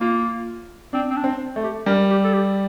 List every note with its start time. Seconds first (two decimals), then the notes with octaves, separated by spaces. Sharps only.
0.01 A#3 F4
0.93 C4 D4
1.11 C4
1.17 D4
1.24 C4
1.56 A3
1.63 G4
1.86 G3 A#4
2.10 G4
2.24 A4
2.33 G4